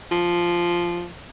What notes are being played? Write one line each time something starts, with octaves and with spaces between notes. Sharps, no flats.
F3